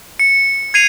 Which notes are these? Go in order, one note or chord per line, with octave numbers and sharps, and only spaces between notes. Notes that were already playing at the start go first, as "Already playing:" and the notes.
C#7
G#6 C7 D#7 F7